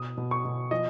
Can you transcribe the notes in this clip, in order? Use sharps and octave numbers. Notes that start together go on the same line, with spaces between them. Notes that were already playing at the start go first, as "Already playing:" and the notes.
Already playing: B2 D#6
B2
C#6
B2
F3 D#5